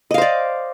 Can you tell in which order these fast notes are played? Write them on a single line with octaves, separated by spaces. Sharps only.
D#5 F5 C5 D5